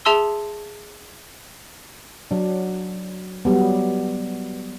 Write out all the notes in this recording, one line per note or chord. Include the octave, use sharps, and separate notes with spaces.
G#4 E5 A5 C6 E6 G7
F#3 D4
F#3 G3 B3